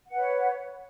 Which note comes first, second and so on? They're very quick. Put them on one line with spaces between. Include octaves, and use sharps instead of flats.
F#5 B4 C#5